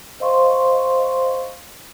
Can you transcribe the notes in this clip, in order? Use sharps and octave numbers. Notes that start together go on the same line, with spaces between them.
C5 D#5 F5 C6 C#6